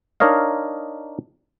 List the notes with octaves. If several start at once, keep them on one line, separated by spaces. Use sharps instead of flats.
D4 D#4 A#4 C#5 D#5 F5